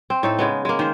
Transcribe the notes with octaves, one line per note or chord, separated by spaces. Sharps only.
C4
A2 D#4 A4
C#3 G#3 B3
G#3 A#3
D#3 C5